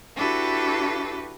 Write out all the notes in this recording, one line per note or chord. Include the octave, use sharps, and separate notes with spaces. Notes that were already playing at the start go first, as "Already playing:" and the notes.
D4 E4 F#4 G4 A4 B4